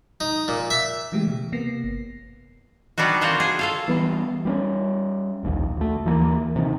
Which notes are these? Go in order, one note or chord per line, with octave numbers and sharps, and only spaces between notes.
D#4
A#2
E5
C#3 E3 G#3 A3 G4
B2
C3 A#3 B3 A#6 C7
G1
G3 B3 D4 D#4 F#4
A#3 C4 F4 F#4 C5
G#4
F4 A4 F5
E3 G3 B3
G3 B3 C#4
F1 A#1 D#2
D2 A3
D#2 E3 F3 A#3
C3 D#3